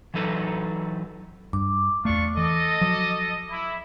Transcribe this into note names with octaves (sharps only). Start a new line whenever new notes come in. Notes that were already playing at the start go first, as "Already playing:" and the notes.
E3 F#3 D#4 A4 B4
G2 D6
E2 A3 D4 F4 C#6
E3 A4 D#5
F3 F#3
E4